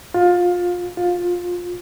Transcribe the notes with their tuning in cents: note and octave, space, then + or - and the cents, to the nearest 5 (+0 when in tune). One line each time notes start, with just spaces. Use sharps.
F4 +20
F4 +15